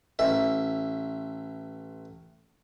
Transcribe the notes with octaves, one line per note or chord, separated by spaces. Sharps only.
A1 E5